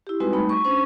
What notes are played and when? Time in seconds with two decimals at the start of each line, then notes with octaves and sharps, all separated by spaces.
0.07 E4 G4
0.20 G3 G#3 C4 D#4 F#4 B4
0.33 G3 A3 D#4 B5
0.49 C#6
0.64 C#4 D4 C5 C#6